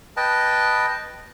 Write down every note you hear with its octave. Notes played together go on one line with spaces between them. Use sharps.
B4 D#5 G5 A5